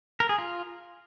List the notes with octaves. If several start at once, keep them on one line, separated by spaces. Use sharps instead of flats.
A#4
G#4
F4